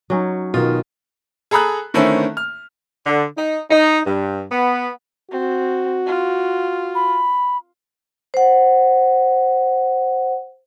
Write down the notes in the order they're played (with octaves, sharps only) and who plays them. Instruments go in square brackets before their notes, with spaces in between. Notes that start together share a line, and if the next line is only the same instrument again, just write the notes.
[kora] F#3 C#4 D#4
[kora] B2 [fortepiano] D#3 F4
[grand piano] G#4 A4 A#5 B5 D#6 F#6
D3 D#3 A3 C4 C#4 E4
F6
[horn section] D3
D#4
D#4
G2
B3
[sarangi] C4 [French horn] F#4
[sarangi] F4
[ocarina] B5
[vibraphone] C5 F#5